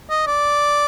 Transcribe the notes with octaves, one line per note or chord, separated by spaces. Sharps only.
D#5
D5